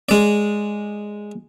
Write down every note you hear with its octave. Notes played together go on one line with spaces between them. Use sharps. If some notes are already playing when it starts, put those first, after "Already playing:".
G#3 D5